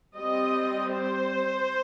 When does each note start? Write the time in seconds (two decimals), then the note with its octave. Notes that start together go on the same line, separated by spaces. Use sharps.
0.17 G3 C4 D#5
0.95 C5